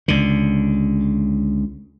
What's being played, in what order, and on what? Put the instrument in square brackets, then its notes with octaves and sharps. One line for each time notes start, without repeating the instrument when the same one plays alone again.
[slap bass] C#2 D3